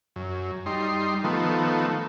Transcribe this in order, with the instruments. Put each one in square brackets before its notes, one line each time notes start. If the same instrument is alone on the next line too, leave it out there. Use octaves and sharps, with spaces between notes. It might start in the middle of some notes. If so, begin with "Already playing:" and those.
[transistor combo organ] F#2
G3 D#4 C6
D#3 F3 A3 B3